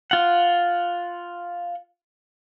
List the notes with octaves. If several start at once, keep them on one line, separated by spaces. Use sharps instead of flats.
F4 F#5